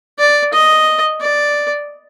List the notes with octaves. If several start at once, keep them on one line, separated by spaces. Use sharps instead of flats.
D5
D#5
D5